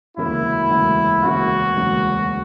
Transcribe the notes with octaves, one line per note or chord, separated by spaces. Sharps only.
E1 D2 C#3 F#3 A#3 E4
E1 D2 C#3 F#3 A#3
E1 D2 C#3 F#3 A#3 F#4
E1 D2 C#3 F#3 A#3